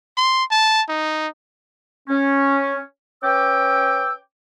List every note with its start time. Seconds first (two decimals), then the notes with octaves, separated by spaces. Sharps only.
0.17 C6
0.51 A5
0.89 D#4
2.08 C#4
3.23 C#4 B4 G5 D6 E6